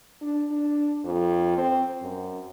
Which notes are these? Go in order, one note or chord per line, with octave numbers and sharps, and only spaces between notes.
D4
D4
F2
C4
F#2